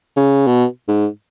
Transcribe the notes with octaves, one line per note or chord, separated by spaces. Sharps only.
C#3
B2
G#2